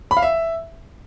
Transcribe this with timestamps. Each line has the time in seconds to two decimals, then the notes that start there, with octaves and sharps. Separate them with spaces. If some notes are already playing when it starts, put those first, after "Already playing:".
0.11 B5
0.17 F5
0.22 E5